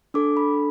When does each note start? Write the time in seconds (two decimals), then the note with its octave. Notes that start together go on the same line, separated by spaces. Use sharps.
0.14 D4 A4 D6
0.37 B5